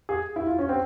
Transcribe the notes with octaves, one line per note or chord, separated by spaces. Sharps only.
G#4
E4
F4
C#4
C4